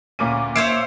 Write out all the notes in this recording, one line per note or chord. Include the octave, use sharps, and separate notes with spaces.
D2 A#2 A#3 C#4 D6 D#7
C5 C#5 E5 F5 C#6 C7 D7 E7